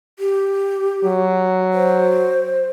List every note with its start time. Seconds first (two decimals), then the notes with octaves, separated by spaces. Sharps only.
0.19 G4
1.04 F#3
1.73 C5